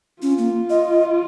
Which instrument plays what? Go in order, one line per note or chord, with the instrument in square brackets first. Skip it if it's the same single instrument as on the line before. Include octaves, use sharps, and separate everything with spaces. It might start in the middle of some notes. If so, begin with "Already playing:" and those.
[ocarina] C#4 [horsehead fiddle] F4
[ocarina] A#3
D#5